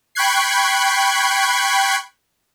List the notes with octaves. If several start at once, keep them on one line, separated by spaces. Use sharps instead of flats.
G5 B5 C#6 F#6 G#6 C7